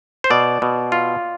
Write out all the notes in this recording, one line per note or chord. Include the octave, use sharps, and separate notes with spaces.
C5
B2 D5
B2
F4